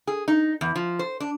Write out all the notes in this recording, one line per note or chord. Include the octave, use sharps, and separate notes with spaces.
G#4
D#4
E2
F3
C5
D4